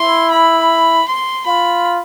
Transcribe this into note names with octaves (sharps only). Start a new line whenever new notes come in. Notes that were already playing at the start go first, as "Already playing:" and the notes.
Already playing: E4 C6
B5
C6
F4 B5